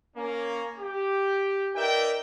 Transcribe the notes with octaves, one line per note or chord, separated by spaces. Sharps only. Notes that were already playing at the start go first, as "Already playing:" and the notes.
A#3 C#4
G4
D#4 A#4 B4 D5 E5 G5